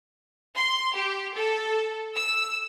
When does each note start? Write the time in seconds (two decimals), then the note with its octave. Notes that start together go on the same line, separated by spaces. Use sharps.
0.56 C6
0.95 G4
1.35 A4
2.16 E6